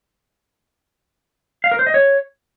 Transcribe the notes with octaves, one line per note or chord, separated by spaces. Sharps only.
F5
A#4
C5
D#5
C#5